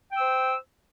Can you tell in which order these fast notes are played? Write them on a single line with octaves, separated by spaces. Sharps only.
G5 E6 C5